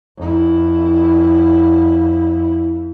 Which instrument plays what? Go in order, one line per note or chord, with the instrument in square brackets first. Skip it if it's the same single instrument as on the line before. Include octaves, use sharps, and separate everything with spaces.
[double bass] F2 E4